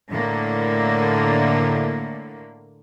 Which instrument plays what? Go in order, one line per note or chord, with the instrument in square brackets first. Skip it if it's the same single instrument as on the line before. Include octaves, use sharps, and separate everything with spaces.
[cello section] A2 D3 A#3